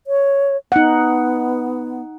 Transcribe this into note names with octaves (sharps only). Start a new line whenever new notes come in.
C#5
B3 D#4 F#5